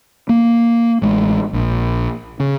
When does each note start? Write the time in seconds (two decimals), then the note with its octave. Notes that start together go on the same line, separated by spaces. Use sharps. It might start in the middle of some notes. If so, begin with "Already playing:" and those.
0.29 A#3
1.02 A1 G#3
1.53 A#1
2.40 C#3